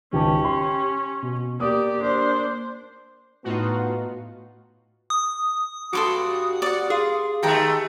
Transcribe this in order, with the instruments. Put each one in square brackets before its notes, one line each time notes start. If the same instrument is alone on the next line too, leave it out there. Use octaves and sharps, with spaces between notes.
[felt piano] G#1 C#2 A5 [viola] C#4 [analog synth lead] G4
[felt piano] C6
[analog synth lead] B2
[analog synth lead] A#3 [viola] G4 D5 [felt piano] D#6
[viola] D4 C5 [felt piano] D5
[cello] A2 [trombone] B3 [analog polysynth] D#4 F4 F#4
[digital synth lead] D#6
[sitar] G2 [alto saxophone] F#4 [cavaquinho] A4 C6 D6
[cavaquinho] D5 F#5
[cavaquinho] F4 [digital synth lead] G#4
[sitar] D#3 G#3 A3 [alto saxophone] G4 [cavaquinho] A4 G5 A#5